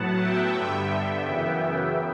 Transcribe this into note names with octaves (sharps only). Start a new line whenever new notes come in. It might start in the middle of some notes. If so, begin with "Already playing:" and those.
Already playing: A2 F#3 B3 F#5 A5
E5 G5
G2 D3 G3 B3
F#2 C#3 E3 B3